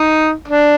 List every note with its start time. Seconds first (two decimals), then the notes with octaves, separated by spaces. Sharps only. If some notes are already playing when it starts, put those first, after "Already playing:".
Already playing: D#4
0.48 D4